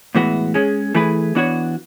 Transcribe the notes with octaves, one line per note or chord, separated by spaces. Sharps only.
A2 E3 G#3 B3 F#4
G#3 C#4 G#4
E3 A3 E4 G#4 B4
E3 B3 D4 F#4 C#5